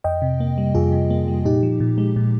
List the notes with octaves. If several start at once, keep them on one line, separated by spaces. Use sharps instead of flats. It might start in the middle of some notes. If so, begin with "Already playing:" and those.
F2 D#5 G5
C3
A#3
G3
F2 F4 G#4
C3
A#3
G3
A#2 D#4 G4
F3
A#2
G#3
A#2